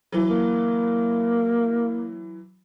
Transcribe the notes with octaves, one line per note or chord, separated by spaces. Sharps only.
E3 F#3
A#3